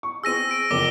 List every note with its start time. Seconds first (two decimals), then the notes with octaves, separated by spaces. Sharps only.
0.03 C#6
0.24 C4 G#4 E6 A#6 D#7
0.50 A#6 D7
0.71 F#1 F2 D6 A#6 G7